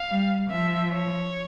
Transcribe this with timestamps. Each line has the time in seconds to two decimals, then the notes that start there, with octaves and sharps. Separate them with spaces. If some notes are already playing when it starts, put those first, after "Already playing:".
Already playing: F5
0.09 G3
0.50 F3 E5
0.93 C#5